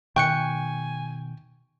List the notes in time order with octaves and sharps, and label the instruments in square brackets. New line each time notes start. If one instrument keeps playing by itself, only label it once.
[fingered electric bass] B2 D#3 [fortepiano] G5 [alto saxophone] G#5 [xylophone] C#6 F#6 C#7